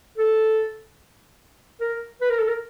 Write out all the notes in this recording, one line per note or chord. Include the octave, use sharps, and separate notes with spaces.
A4
A#4
B4
A#4
A4
A#4